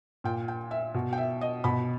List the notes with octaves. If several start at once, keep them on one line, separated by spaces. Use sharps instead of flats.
A#2 G5
G5
E5
B2
G5
E5
D#5
B2 B5